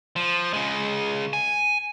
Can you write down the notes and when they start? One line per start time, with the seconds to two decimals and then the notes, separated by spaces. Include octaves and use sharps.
0.16 F3
0.54 C#3 G#3
1.33 G#5